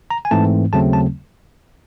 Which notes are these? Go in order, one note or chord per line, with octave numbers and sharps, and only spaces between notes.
A#5
G#5
G#2 E3 A3 C4 A5
D#2 C#3 F#3 A3 C4 A5
A5